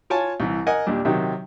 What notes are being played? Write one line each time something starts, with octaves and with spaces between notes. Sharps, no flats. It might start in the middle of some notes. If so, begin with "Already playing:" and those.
F4 C#5 G#5 A5
C2 E3
A#4 D#5 F#5 G#5
D#2 A#2 G3 D4
C3 D#3 F#3